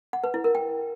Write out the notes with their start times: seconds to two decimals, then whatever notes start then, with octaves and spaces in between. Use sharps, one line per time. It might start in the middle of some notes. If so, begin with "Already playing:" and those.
0.13 F#5
0.24 B4
0.34 E4
0.44 A#4
0.55 G5